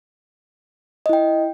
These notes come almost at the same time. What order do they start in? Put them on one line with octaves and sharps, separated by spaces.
D#5 E4 G5